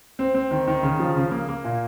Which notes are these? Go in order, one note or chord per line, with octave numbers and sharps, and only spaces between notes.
C4
C4
D#3
D#3
C#3
F3
C#3
A#3
A#3
A#2